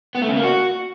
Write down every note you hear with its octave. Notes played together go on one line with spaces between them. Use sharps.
B3
A3
C#3
A#3
F#4